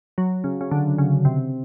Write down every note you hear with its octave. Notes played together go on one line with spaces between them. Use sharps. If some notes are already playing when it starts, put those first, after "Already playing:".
F#3
C#3
C#3
D3
C#3
C3